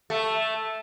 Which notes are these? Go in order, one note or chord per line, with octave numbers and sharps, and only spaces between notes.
A3